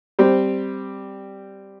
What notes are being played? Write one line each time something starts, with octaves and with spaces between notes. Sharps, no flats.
G3 C4 G4